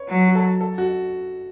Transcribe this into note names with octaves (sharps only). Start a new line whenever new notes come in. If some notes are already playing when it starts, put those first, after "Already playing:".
Already playing: B4 C#5
F#3
F#4
A4
A4
F#4